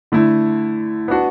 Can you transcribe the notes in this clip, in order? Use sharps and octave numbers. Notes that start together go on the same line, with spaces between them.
D3 A3 E4
B3 D4 F#4